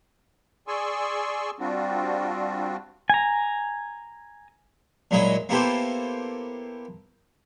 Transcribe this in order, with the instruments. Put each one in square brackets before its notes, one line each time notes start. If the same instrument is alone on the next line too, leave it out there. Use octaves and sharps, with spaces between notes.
[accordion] G#4 D5 G#5 C6 C#6 E6
G3 C4 D4 F4 F#4
[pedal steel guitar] G#5 A#5
[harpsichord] A#2 F#3 G#3 E4 D#5 B5
A#3 B3 E4 G4 A4 C5